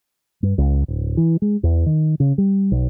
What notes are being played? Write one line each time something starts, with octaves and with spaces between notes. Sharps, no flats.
G2
C#2
D1
E3
G#3
E2
D#3
C#3
G3
B1